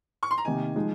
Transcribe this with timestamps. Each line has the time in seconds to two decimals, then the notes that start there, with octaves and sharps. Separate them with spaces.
0.23 C#6
0.31 C6
0.38 A#5
0.45 C3 D#3 A#3 D#4 G#5
0.76 F3 G#3 D#4